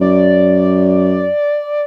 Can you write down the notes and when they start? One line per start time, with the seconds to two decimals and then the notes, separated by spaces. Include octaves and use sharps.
0.01 F#2 D5